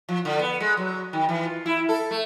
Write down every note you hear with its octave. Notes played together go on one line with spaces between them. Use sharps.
F3
D3
B3
G#3
F#3
D#3
E3
F4
E4
A4
A3